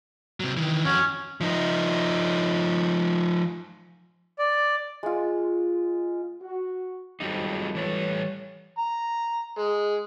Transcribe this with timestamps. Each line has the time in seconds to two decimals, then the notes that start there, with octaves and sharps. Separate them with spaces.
0.40 C3 F#3
0.57 D#3 E3
0.85 F2 C#4 F#4
1.41 F3 D#4
4.39 D5
5.03 G#3 F4
6.41 F#4
7.20 G#1 F2 F#3 G3 D#4
7.75 E3 G3 A4 B4 C#5
8.78 A#5
9.58 G#3